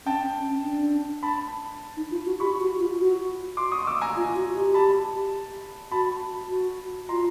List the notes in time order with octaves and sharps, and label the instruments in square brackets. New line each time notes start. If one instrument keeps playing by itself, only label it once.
[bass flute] C#4 [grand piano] G5 A5
[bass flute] C#4
C#4
D4
[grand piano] A5 B5
[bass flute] D#4
F4
F#4
[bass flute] G4 [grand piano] B5 C#6
[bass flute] F#4
F4
F#4
[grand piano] C6 D6
C#6 D#6
D6 E6
G#5 A#5
[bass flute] F4
F#4
G4
[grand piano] A5 B5
[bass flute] F#4 [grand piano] A5 B5
[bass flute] F#4
[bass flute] F4 [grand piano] A#5 C6